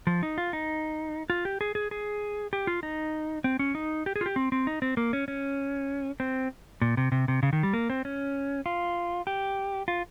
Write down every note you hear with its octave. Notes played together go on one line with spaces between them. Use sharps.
F3
D#4
F4
D#4
F4
G4
G#4
G#4
G#4
G4
F4
D#4
C4
C#4
D#4
G4
G#4
F4
G4
C4
C4
D#4
C4
A#3
C#4
C#4
C4
A#2
C3
C3
C3
C#3
D#3
G3
A#3
C4
C#4
F4
G4
F4